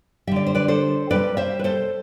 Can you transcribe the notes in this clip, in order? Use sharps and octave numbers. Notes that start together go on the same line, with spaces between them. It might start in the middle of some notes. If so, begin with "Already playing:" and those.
D3 G3 D5 E5
C5
B4 D5
A4 C5
C3 G3 B4 D5
C5 E5
B4
A4 C5